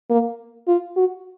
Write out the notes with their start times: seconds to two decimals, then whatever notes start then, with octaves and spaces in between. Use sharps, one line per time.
0.10 A#3
0.68 F4
0.97 F#4